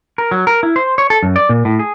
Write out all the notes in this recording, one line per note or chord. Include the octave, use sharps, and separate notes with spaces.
A#4
F#3
A#4
E4
C5
C#5
A4
F#2
D5
A#2
A2
G#4